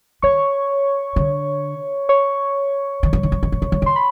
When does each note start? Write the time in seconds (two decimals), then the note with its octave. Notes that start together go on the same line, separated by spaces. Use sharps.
0.22 D#3 C#5 C#6
1.16 D3
2.09 C#5 C#6
3.03 D#3
3.13 E3
3.23 D#3
3.32 E3
3.43 D#3
3.52 E3
3.62 D#3
3.72 E3
3.82 D#3
3.86 C6
3.96 B5